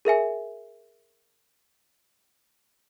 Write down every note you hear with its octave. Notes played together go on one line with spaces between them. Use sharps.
G#4 A#4 E5 G#5